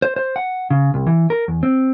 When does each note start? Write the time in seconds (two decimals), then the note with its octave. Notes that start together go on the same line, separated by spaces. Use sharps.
0.02 C5
0.16 C5
0.36 F#5
0.70 C#3
0.94 C2
1.07 E3
1.30 A#4
1.48 E2
1.63 C4